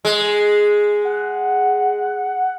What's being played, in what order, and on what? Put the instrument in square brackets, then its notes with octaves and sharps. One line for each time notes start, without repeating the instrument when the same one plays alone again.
[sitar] G#3
[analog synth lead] F#5